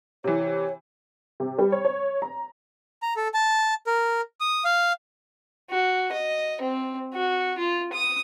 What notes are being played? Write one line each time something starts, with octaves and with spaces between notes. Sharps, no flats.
C3 E3 C#5
C3
G3
C#5
C#5
A#5
A#5
A4
A5
A#4
D#6
F5
F#4
D#5
C4
F#4
F4
D#6